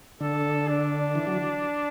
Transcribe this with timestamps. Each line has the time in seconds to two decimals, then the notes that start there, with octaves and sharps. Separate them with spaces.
0.21 D3 A4
0.68 D4
1.15 E3
1.27 F#3